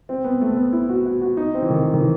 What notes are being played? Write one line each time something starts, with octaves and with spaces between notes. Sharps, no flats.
C4
B3
A3
B3
E4
F#4
F#4
F#4
D#4
C4
E3
D#3
E3
D#3
E3